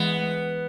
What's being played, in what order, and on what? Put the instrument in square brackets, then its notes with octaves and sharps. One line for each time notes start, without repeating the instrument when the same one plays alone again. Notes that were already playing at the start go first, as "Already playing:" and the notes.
Already playing: [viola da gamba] E3 G#3 [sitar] B3